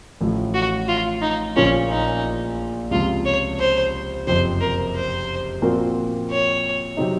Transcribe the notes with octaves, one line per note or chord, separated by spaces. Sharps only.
A1 A2 F3
F#4
F4
D#4
A#1 A#2 F3 A#3 C#4 F4
D#4
C#2 C3 F3 F4
C#5
C5
F#1 F2 C3 C5
A#4
C5
A#2 F3 C4 F#4 A#4
C#5
C3 F#3 C4 D#4